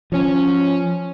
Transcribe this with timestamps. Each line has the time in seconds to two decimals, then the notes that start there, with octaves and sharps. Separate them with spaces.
0.12 F3 C#4